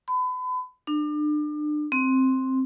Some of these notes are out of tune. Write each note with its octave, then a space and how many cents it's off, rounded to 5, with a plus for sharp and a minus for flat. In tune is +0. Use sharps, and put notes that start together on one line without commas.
B5 +35
D4 +35
C4 +5